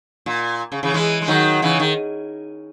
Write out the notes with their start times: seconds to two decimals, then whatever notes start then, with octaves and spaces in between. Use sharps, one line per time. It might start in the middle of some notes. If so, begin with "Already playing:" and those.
0.26 A#2
0.72 C#3
0.83 C#3 E3
0.94 E3 G#3
1.22 G#3
1.28 D#3 F#3
1.62 C#3 E3
1.80 D#3